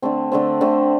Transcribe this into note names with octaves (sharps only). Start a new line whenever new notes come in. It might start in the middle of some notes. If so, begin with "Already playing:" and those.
D3 A3 C4
D3 A3 C4
D3 A3 C4